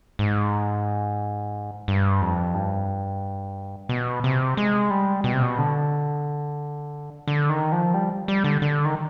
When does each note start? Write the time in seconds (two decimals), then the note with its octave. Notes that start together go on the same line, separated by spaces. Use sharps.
0.19 G#2
1.88 G2
2.21 F2
2.54 G2
3.89 B2
4.24 C3
4.57 G#3
4.90 G3
5.24 B2
5.33 C3
5.42 B2
5.58 D3
7.28 D3
7.49 D#3
7.72 F3
7.94 G3
8.28 G3
8.44 D3
8.62 D3
8.85 D#3